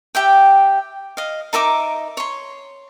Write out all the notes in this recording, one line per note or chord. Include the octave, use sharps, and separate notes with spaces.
G4 E5 G5
D#5 F5
D#4 A#4 E5 D6
C#5 C6